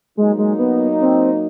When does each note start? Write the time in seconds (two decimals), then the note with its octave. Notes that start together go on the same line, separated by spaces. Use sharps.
0.17 F#3 G#3 A#3 D#4
0.38 G#3
0.59 B3
1.01 C4